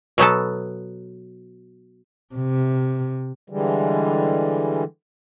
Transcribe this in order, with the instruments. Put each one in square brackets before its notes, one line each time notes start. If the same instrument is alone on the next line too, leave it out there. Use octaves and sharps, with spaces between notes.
[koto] B2 F#3 B3 A4
[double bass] C3
[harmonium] D3 E3 G3 G#3